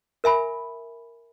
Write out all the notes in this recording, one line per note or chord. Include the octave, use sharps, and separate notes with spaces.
A#4 E5 G#5 B5